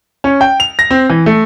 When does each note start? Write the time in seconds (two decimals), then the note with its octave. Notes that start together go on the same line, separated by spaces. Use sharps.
0.24 C#4
0.41 G5
0.60 F7
0.79 A#6
0.91 C4
1.09 E3
1.26 A3